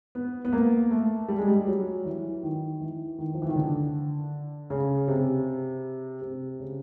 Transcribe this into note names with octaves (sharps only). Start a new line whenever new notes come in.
B3
B3
A#3
A3
G3
G#3
G3
F#3
E3
D#3
E3
D#3
F3
E3
D#3
D3
C#3
C3
C3
C#3